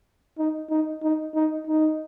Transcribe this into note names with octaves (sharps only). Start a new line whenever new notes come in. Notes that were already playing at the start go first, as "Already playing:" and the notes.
D#4
D#4
D#4
D#4
D#4